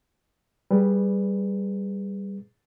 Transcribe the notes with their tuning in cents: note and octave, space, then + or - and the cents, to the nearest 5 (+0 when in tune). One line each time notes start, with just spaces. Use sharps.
G3 +0 G#4 -10 B4 +0